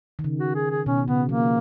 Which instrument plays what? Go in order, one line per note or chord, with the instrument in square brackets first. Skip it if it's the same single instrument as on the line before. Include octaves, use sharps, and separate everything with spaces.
[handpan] D#3
C#3
[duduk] F#4
G#4
G#4
[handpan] B2 [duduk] C#4
[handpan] C#3 [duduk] B3
[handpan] F3 [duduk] A#3